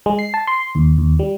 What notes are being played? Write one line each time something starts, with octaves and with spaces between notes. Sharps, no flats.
G#3
C7
A5
C6
D#2
D#2
G3